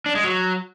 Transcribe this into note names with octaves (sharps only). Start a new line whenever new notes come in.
D4
G#3
F#3